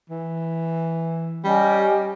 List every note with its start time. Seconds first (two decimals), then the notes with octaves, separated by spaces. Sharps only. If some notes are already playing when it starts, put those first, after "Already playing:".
0.10 E3
1.44 G3 C#4 G4 D#5